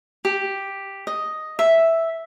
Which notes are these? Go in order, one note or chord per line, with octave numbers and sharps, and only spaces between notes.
G4
D#5
E5